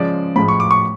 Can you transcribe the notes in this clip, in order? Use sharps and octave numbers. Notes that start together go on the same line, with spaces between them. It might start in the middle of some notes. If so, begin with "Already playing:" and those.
Already playing: C#3 F3 G#3 D5
A2 F3 G#3 B5
C#6
D6
C#6